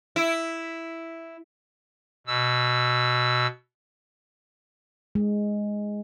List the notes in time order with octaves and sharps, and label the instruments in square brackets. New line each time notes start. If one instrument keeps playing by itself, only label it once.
[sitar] E4
[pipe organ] B2 E6
[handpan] G#3